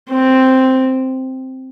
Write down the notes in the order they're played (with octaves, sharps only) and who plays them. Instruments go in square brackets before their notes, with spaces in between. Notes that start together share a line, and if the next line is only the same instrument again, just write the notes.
[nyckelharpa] C4